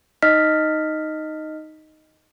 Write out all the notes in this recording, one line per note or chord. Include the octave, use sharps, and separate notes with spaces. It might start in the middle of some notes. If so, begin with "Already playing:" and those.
D#4 D#5 F6 B6